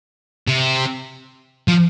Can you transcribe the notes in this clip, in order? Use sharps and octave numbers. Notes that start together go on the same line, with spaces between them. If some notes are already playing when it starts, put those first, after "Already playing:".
C3
F3